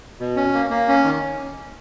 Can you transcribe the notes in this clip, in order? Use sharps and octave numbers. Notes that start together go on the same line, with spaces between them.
B2
C#4
A#3
A#3
C#4
D#3